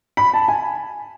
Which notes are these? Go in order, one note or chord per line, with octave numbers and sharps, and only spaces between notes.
B5
A5
G#5